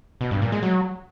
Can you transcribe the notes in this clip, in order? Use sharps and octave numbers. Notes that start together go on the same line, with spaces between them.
B2
G2
A#2
G#3
F#3